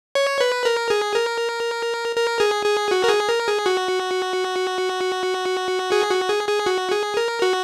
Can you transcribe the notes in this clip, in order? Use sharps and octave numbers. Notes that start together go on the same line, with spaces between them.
C#5
B4
A#4
G#4
A#4
A#4
G#4
G#4
F#4
A#4
G#4
A#4
G#4
F#4
G#4
F#4
G#4
G#4
F#4
G#4
A#4
F#4